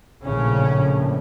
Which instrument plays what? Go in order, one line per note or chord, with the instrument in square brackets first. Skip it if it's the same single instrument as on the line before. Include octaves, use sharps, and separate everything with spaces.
[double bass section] A#1 A2 C#3 C#4